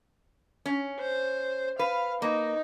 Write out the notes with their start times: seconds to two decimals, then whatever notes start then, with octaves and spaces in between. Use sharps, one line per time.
0.66 C#4
1.00 C5
1.79 B4 F5
2.22 A#3 D#4